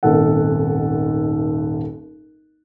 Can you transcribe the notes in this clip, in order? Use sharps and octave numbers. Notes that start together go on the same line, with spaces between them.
D#1 G#1 D#2 A4 F#5